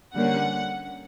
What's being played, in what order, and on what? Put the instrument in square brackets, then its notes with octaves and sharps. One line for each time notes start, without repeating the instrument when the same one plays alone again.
[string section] D3 G3 A#3 C#4 F#5